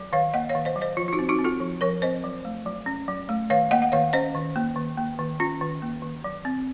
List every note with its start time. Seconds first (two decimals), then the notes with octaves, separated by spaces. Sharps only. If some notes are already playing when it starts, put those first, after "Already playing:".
Already playing: F#3
0.13 D#3 C#5 F5
0.34 A#3 D#5 F#5
0.49 C#5 F5
0.55 D#3
0.65 C5 D#5
0.76 F#3
0.81 C5 D#5
0.97 F3 F4
1.08 F4
1.13 D#4 F#4
1.19 C4
1.29 D#4 F#4
1.39 C4
1.44 F4 A4
1.60 F3
1.81 F3 A#4 C#5
2.02 C4 C5 D#5
2.24 F#3
2.45 A3
2.66 F#3
2.86 C#4
3.08 F#3
3.29 A3
3.50 D#3 C#5 F5
3.71 A#3 D#5 F#5
3.82 F#5
3.92 D#3 C#5 F5
4.13 C#4 C5 D#5
4.35 D#3
4.56 A#3
4.76 D#3
4.98 A#3
5.19 D#3
5.40 C#4 F4
5.61 D#3
5.82 A#3
6.02 D#3
6.24 F#3
6.45 C4